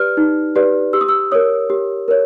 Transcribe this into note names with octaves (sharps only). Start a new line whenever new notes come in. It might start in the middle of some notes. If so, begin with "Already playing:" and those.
Already playing: G4 B4 D5 F6
D#4
G4 B4 D5
G4 E6
D#6
E6
A#4 C#5 D#6
G4
A#4 C#5